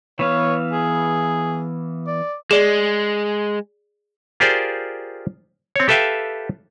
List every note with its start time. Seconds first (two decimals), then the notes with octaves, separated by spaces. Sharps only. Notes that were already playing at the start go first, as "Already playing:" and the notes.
0.19 E3 B3 C#5 F5
0.72 G#4
2.07 D5
2.51 G#3 G#4 D5
4.40 F4 G4 G#4 A#4 C5 D5
5.76 C4 C#5
5.88 G4 A4 B4 E5 F5 G5